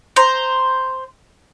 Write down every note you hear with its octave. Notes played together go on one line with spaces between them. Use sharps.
C5 A#5